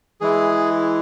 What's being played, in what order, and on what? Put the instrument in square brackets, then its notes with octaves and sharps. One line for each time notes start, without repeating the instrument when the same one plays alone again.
[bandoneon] E3 G#3 E4 G#4